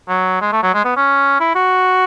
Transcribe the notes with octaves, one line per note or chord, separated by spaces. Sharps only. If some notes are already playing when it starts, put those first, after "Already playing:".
F#3
G#3
A3
F#3
G#3
B3
C#4
E4
F#4